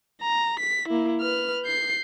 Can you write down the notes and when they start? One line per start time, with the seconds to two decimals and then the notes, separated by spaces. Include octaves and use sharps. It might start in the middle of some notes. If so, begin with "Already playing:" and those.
0.22 A#5
0.60 B6
0.89 A#3 E4
1.21 B4 F6
1.65 G6 C7